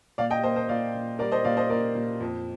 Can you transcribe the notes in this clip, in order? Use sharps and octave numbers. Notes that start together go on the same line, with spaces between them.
A#2 D5 F5
D#5 G5
A#3 C5 D#5
C5 D#5
A#2 D5 F5
A#2
G3 A#4 D5
C5 D#5
A#2 D5 F5
C5 D#5
A#3 A#4 D5
A#2
F2